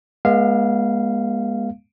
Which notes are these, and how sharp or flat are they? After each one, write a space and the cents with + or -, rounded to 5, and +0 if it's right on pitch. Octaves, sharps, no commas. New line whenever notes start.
G#3 +0 B3 -45 F5 -15